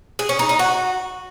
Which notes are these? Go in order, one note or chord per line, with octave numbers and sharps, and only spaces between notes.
G#4
C#4
D#4
D#4
F#4